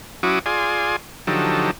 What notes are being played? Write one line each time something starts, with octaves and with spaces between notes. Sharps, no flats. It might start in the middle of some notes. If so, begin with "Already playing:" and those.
F#3 C#4 E4 F#4 D6 D#6
F4 G#4 D5 G#5 C6
D3 F3 F#3 D#4 G4 A4